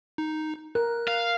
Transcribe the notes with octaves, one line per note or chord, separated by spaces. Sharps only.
D#4
A#4 F#6
F5